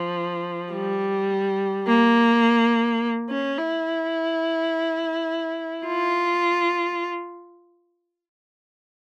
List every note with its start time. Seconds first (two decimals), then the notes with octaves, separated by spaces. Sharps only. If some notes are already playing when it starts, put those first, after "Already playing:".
Already playing: F3
0.73 G3
1.87 A#3
3.29 C#4
3.58 E4
5.86 F4